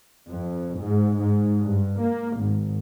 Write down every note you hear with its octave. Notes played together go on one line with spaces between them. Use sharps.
F2
G#2
G#2
G2
A#3
G#1